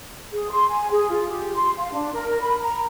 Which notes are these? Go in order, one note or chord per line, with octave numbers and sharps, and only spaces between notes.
G#4
C6
G#5
G#4
F4
G4
C6
F5
D4
A#4
B5
A#5